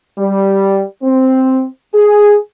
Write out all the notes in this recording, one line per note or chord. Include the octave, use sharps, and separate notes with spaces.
G3
C4
G#4